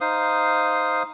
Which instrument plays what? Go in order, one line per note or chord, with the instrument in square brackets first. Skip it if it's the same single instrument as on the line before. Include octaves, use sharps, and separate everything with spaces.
[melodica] D#4 C5 F5 D#6